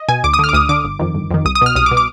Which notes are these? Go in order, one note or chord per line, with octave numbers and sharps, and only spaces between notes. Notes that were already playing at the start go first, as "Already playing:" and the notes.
Already playing: D#5
B2 G#5
D2 D6
D#6
D3 F6
D6
D2 D#6
D3 D6
G1
F2 D#3
G1
F2 D#3
C2 D#6
D#6
B2 F6
C2 D#6
D6
B2
D6